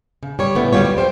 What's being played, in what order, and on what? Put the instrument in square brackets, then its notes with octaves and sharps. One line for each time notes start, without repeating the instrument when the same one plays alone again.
[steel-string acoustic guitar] C#3
G3 C#5
A2 C#3 B3
D2 C3 G3 F4 C#5
G3
G3 C5 F5 G5